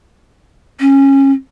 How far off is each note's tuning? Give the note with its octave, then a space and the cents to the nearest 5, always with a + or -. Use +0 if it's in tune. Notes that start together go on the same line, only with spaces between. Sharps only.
C#4 -20